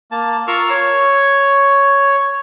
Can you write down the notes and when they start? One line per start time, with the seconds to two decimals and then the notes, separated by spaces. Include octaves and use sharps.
0.12 A#3 A5
0.47 F4 A#4 F5 C#6 E6 F6
0.70 C#5